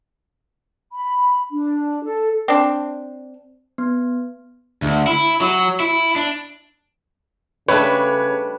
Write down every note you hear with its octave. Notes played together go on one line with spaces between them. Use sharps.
B5
D4
A4
C4 D4
B3
D2
E4
F#3
E4
D4
C#3 G3 A3 D4 B4 C#5